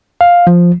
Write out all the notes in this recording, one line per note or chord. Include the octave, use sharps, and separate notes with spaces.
F5
F3